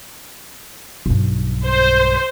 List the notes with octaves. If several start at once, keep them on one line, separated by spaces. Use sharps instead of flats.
B1 G2
C5